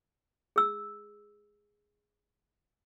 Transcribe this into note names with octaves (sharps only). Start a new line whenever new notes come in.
G#4 E6